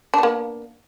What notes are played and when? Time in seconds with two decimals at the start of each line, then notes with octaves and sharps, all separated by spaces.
0.14 D4
0.18 B3
0.23 A#3